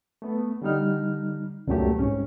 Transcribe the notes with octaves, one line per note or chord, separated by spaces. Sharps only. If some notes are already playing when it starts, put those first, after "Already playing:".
A3 B3
D3 G3 D#4 F6
C#2 F#2 A#2 F#3 A3 G4
C2 G#2 C#4